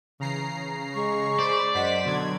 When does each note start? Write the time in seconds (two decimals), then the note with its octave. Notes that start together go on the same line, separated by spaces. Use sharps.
0.20 C#3 E3 A#5 C7
0.94 G#3 C#6
1.39 C5 D5 B5
1.75 F#2 C5 D#5 F#5 B6
2.04 B2 D3 F#3 C6 G#6